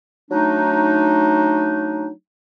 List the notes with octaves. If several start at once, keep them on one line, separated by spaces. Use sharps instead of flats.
F#3 A3 D4 D#4